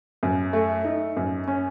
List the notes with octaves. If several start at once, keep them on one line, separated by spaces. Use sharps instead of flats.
F#2
A3
D#4
F#2
C#4